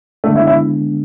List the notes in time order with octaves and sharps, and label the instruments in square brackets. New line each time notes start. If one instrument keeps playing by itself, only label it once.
[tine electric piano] D3 G#3 B3 D4 [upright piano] A3
[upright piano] E4
E4